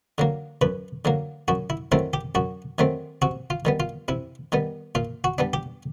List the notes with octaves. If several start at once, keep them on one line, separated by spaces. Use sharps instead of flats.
D3 F#3 A#3
F#2 B4
D3 F#3 A#3
F#2 F#4
E4
D#3 F#3 A3 C4 E4
G4
F#2 F#4
D#3 F#3 A3 C4
C3 F#4
F4
D#3 G3 B3
F4
C3 E4
D#3 G3 B3
A#2 F4
F#4
G3 B3 D4
G4